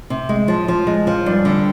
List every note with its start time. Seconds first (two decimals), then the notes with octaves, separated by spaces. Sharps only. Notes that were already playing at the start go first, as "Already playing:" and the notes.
0.10 C3
0.29 G#3
0.48 F3
0.68 F3
0.87 G#3
1.07 F3
1.26 G2
1.45 D3